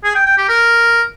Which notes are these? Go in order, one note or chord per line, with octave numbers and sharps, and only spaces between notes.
G#4
G5
G5
G4
A#4